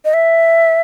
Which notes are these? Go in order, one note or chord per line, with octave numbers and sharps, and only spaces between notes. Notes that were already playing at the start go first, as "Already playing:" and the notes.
D#5
E5